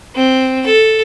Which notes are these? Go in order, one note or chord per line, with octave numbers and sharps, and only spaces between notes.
C4
A4